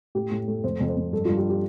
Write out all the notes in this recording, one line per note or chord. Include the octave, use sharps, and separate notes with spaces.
A2 G4
A2
A3
F2 C5
F2
C5
F2
G2 A4
G2 F4
G4
G4